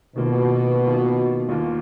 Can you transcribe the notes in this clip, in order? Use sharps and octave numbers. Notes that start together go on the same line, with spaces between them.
B2 D#3 A#3 F4
D#3 A#3 F4
D#2 D#3 A#3 F4